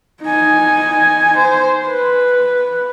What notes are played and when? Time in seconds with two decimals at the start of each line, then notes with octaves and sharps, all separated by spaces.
0.23 D#4 G#5
1.36 C5
1.86 B4